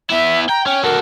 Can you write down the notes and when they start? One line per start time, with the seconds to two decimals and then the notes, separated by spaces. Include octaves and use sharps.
0.10 B3 E4 E5
0.49 G5 A#5
0.66 C#4 G5
0.84 F#4 A4 A#4